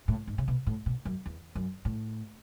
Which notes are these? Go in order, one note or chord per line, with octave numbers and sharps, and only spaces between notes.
A2
G#2
C#3
B2
A2
B2
F#2
E2
F#2
A2